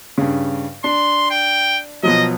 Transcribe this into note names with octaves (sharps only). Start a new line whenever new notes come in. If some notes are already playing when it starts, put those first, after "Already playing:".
G2 C#3
D4 C6
G5
B2 F3 F#3 D#5